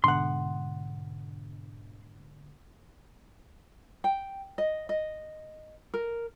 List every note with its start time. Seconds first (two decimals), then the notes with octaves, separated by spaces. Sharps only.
0.04 G#2 B2 D3 F#5 C6
4.04 G5
4.58 D#5
4.89 D#5
5.94 A#4